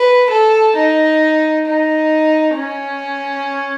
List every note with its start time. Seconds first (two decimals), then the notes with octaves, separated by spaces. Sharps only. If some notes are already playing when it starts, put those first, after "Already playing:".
Already playing: B4
0.30 A4
0.75 D#4
1.66 D#4
2.56 C#4